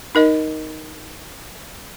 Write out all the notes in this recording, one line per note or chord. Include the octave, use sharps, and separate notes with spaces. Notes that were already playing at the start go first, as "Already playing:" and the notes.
D#4 A#4 D#5